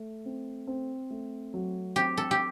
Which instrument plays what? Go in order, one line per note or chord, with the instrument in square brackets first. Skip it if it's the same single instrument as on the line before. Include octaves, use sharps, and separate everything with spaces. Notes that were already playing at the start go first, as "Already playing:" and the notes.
Already playing: [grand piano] A3
C4
C4
A3
F#3
[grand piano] C4 [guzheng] G4
[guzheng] A4
G4